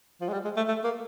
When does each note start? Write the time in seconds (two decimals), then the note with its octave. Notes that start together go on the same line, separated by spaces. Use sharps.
0.21 F3
0.29 G#3
0.33 G3
0.44 G#3
0.57 A3
0.68 A3
0.84 A#3